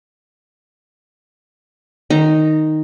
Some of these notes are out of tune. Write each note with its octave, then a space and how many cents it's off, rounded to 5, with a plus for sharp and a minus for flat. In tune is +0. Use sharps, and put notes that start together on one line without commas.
D#3 +0 D#4 +0 A#5 -30